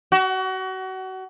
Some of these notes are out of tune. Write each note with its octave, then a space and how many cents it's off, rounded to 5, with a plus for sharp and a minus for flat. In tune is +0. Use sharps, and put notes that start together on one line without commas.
F#4 +30